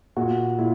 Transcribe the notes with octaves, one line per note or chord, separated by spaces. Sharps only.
A#2 F#4
A#2 E4